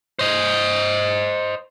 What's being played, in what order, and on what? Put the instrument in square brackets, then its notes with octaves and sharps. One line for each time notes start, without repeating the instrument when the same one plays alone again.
[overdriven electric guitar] C5 D#5